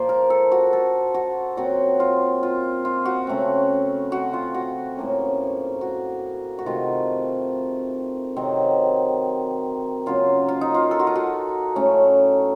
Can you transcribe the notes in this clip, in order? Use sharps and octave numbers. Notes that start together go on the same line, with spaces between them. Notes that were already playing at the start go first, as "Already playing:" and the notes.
Already playing: A#2 F3 A#3 C5
A#4
A4
F#4
A4
F#4
A#2 F#3 C4 F#4
F4
F4
F4
F#4
C#3 A3 C4
F#4
F4
F#4
A2 F3 A#3 C#4
F#4
F#4
C3 D#3 A3 F4
C3 D#3 F#3 C4
C#3 F#3 A#3 F4
F4
D#4
F4
A4
F#4
F4
F#4
A2 F#3 A3 C#4